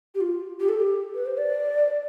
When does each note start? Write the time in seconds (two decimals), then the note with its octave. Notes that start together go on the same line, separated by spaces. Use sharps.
0.15 G4
0.21 F4
0.60 G4
0.69 A4
0.78 G4
1.15 B4
1.26 C5
1.38 D5